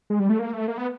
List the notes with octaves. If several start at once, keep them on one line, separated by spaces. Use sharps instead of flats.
G#3
G3
A3
A#3
A3
A#3
B3